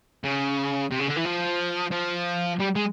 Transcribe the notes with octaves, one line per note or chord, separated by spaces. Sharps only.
C#3
C3
C#3
D3
E3
F3
F3
G3
G#3